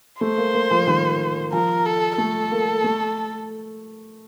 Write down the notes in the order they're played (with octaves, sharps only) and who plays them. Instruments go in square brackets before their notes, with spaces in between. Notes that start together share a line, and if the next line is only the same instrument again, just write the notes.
[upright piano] A3 [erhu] C5
[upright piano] A#3
A#3
F3
D#3
[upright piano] F3 [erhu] A#4
[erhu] A4
[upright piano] A3 [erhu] A4
[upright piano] A#3
A3